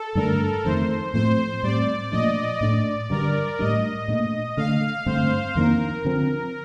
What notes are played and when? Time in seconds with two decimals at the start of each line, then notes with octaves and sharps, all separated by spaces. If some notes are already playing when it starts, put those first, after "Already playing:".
Already playing: A4
0.15 G2 D3 A3 D4 A#4
0.64 F2 D#3 A3 C5
1.14 A2 F3 A3 C4 C5
1.63 A2 G3 C4 D5
2.12 A#2 F3 A3 D4 D#5
2.61 A2 A3 D4 D5
3.10 G2 D3 G3 A#4
3.59 A2 G3 D4 D#5
4.08 A#2 A3 D4
4.57 D3 A3 D4 F5
5.06 G2 D3 A3 C4 C5
5.55 F2 D#3 A#3 D4 A#4
6.05 D3 F3 C4